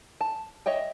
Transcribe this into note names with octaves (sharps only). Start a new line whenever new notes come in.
A5
C#5 D#5 E5 G5